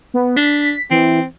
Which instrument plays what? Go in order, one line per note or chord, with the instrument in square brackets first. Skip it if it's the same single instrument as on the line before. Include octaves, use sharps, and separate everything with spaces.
[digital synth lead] B3
[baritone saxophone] D4 [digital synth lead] B6
[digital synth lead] E3 [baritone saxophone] C4